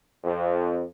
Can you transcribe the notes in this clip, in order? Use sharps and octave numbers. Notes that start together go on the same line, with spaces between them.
F2